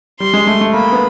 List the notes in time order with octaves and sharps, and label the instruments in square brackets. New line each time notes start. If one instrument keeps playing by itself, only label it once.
[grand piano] G3 [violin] C6
[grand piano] G#3
A3
A3
[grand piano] A#3 [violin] B5
[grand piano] B3